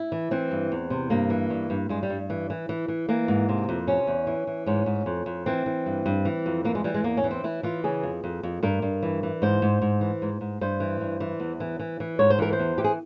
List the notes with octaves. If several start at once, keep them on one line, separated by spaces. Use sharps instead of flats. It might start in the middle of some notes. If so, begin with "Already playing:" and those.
Already playing: E4
E3
E3 C4
G2
E2
C3
G2 A#3
E3
G2
G2
G2 G#3
G3
G2
E3
E3
E3
E3
E3 A#3
G#2
C3
F2
C3 C#4
E2
E3
E3
G#2 C#4
G#2
F2
F2
E3 C4
E3
G2
G2
E3
F2
E3 A#3
G#3
E3 G3
G#3
E2 A#3
C#4
E3
C4
E3 E4
E3 F4
C#3 G#4
F2
F2
F2
G2 A#4
G2
E3
E3
G#2 C5
G#2
G#2
E3
G#2
G#2
G2 C5
E3
G2
E3
E2
E3
E3
E3
G#2 C#5
C5
E3 A#4
C5
E2
E3 G4
G#4